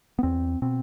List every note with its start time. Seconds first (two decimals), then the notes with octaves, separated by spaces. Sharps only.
0.19 B3
0.23 E2 C4
0.62 B2 C4